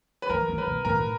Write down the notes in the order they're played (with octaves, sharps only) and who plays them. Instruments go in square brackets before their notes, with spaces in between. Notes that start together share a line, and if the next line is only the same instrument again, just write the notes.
[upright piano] B4
[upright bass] E3 [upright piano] A#4
[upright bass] D#3
[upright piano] B4
[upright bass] B2
[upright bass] A2 [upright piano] A#4
[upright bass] A2